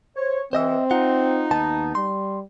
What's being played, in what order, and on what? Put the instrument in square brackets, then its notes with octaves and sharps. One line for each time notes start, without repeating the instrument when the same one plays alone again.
[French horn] C5 [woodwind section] C#5
[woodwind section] C#2 E3 [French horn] C4 [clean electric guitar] C5 D#5 E5
[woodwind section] D#4 [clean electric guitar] F4 F#5
[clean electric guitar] D#2 B3 A5
[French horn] G3 [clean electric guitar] C6